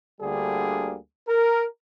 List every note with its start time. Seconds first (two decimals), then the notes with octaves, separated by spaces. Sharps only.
0.20 D2 D3 G3 A#3 G#4
1.28 A#4